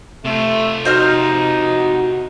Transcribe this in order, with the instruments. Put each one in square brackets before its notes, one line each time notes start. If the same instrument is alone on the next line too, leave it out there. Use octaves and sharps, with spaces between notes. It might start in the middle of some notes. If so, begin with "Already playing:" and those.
[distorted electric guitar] C3 F4 [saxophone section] A3
[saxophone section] D#4 [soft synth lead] F#4 [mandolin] C5 D#5 F6